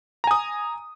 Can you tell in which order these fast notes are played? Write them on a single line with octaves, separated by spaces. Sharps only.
A#5 G#5 D#6